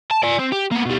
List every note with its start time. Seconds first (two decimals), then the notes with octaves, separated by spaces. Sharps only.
0.11 A5
0.23 D5 G#5
0.39 C4
0.52 G4
0.71 A#3 B3
0.85 B2 G3